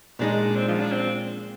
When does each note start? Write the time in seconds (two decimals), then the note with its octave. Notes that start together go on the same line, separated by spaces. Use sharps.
0.19 A#2 G#3 D4 D#4
0.56 C4
0.68 F3
0.80 D4
0.92 C4